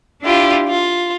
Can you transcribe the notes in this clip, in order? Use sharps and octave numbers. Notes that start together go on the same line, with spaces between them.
D4 E4 F4 G4
F4